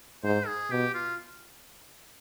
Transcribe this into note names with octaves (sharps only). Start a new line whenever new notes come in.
G#2 C5
G#4
B2 G4
F4